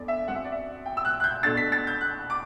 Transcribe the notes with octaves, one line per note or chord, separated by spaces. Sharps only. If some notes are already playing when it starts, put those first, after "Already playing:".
Already playing: E2 D3 D5
E5
F#2 F#3 C4 F#5
E5
D5
E5
G5
E6
F#6
F#6
G6
B2 A3 D4 A6
B6
A6
G6
F#6
D6